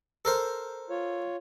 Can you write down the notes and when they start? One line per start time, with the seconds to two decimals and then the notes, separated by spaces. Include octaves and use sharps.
0.25 A4 A#4 C5
0.90 F4 C#5